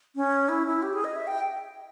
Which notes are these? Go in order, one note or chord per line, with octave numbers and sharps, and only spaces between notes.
C#4
E4
E4
G4
G#4
D#5
E5
G5